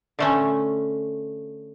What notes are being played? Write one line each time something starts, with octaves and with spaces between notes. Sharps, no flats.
D3 A3 C#4